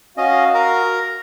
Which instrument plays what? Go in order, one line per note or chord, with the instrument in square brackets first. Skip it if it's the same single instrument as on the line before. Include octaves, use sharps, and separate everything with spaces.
[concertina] C#4 D#5 [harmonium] F#4 F5
[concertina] A#4 A#5